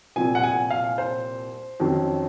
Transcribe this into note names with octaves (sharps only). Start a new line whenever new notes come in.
C2 A#2 F3 C4 G#5
F#5
G#5
F5
C5
F2 D#3 F#3 C#4